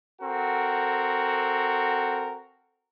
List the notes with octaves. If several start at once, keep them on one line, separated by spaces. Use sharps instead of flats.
C4 F#4 A4 A#4